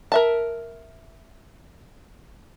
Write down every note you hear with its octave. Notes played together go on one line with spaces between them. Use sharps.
A#4 E5 A5